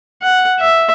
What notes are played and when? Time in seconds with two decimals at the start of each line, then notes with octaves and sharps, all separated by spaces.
0.23 F#5
0.60 E5